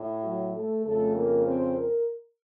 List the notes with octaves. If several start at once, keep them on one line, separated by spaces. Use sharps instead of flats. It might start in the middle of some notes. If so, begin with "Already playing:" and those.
Already playing: A2
F#3 F#4
A3 A4
F2 C#3 A3 A4
A#3 A#4
C4 C5
A#4